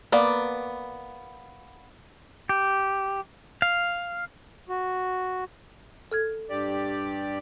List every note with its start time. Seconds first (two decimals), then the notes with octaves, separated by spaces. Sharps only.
0.12 A#3 B3 D5
2.49 G4
3.62 F5
4.69 F#4
6.12 A4 F6 G#6
6.49 G2 G4 D5